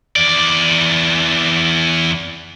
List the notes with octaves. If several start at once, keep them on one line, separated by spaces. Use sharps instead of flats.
E2 D5